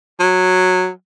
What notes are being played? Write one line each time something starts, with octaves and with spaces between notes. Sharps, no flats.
F#3